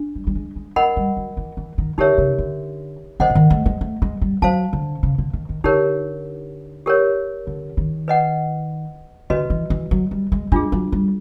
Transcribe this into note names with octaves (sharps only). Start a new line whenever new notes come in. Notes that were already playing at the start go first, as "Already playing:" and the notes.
Already playing: D4
G3
G3
G#3
G#3
G#3 A#4 D#5 F#5 B5
G3
F#3
E3
E3
D#3
D3 D#4 G4 A#4 C#5 E5
C#3
D3
D#3 C5 D#5 F#5
D3
D#3
A3
G#3
A3
G#3
G3
F#3 C5 F5 A5
D3
C#3
D3
D#3
D#3
D3 D#4 G4 A#4 C#5
G4 A#4 C#5
D3
D#3
B4 D#5 F#5
D3 F#4 B4 D#5
E3
E3
F#3
G3
G#3
G#3 D4 F4 G#4
F#3
G3